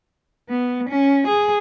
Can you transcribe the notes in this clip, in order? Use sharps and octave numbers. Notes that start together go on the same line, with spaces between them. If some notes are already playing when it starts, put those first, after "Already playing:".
B3
C#4
G#4